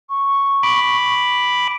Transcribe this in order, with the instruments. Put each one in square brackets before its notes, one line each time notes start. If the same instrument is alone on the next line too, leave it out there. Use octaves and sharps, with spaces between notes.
[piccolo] C#6
[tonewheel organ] B5 D6